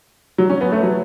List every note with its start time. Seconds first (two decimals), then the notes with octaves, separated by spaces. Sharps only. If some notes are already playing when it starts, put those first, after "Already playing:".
0.38 F#3
0.50 C#4
0.61 B3
0.72 A3
0.83 F#3